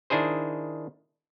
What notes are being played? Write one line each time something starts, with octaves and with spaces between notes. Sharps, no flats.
D#3 D4 E4 G#4 C5